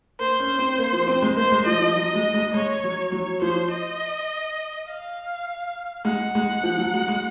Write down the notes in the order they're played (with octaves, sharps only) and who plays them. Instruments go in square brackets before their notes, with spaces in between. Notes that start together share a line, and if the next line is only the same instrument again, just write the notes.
[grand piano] A#3 [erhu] C5
[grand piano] C#4
C4
A#3
F3
C4
G#3
[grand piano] A#3 [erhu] C5
[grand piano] G#3
[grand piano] F3 [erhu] D#5
[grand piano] F3
[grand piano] F#3 [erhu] D#5
[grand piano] G#3
G#3
[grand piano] G#3 [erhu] C#5
[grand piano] F#3
[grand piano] F#3 [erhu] C#5
[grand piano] F3 [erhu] C5
[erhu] D#5
F5
[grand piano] G#3 [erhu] F#5
[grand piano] G#3
F3
F#3
G#3
G#3